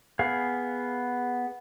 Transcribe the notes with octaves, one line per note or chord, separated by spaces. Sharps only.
B3 G#4 F5